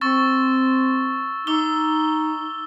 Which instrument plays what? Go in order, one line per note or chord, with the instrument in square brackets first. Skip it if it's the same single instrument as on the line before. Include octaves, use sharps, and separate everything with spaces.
[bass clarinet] C4 [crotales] C#6 E6 A6
[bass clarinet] D#4 [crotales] D6 E6 G7